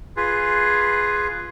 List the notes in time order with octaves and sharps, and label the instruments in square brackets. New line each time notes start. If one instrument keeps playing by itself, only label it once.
[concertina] F4 G#4 B4